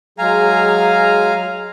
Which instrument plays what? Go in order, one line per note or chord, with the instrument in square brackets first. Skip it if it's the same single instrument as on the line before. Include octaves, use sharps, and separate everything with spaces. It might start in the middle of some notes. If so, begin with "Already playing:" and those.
[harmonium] F#3 G#3 [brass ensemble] G#4 [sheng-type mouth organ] F5 G#5 A#5